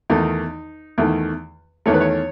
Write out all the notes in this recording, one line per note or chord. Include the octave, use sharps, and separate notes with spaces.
E2 D#3 A3 D#4
E2 D#3 A3
E2 D#3 A3 C#5
B4
C#5